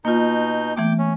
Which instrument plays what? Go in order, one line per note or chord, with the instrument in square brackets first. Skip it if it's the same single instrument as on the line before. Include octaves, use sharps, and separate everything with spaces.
[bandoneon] B2 D#4 G6 [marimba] A#3 F4
[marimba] E3 A3 B3 [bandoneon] G5 D6
[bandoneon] C#4